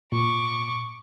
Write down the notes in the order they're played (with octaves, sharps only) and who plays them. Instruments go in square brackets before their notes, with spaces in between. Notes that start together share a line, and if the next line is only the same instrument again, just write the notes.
[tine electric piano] A#2 [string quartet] C#6 D6